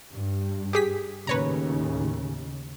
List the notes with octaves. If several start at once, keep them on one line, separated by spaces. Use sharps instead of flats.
G2
G4 G#4 B6
D#2 A2 C#3 B4 C#5 A#5